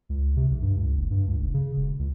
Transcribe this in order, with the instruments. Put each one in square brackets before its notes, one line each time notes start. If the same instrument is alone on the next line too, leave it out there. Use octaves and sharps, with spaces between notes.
[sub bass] C#2
C3
B1
G2
C#2
F#1
G2
C#2
F1
C#3
E1
C#2